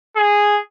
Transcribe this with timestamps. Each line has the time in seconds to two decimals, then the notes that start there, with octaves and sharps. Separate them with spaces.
0.17 G#4